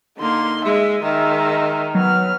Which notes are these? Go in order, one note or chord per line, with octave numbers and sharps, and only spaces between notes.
D3 A#3 D#4 C6
G#3 E5
D#3 G#3 E5
F#3 B3 F6